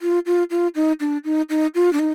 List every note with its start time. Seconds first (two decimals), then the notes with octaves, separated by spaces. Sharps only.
0.02 F4
0.26 F4
0.51 F4
0.75 D#4
1.00 D4
1.25 D#4
1.50 D#4
1.75 F4
1.93 D4
1.99 D#4